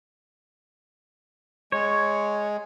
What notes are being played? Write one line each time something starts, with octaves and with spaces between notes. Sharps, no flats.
G#3 C#5